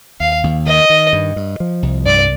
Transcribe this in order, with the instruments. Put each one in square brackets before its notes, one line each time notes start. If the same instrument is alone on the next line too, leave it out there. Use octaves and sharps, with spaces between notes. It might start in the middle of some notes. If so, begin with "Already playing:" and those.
[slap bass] D#2 [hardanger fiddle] F5
[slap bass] D#2
[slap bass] D#3 [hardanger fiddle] D#5
[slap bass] D#3
G2
G2
F3
C2
[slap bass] G2 [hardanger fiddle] D5